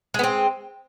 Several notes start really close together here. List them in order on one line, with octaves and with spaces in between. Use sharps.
G#3 B3 C4